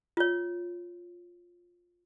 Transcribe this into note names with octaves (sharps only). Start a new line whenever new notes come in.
F4 C#5